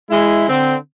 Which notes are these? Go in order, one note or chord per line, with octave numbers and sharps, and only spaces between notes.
G#3 E4
D3 C4